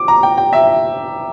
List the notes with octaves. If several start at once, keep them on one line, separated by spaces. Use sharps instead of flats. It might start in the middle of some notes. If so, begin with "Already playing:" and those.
Already playing: D6
A#5
G5
G5
E5